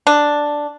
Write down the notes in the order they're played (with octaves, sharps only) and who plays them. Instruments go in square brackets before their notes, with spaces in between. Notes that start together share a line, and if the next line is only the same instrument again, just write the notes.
[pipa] D4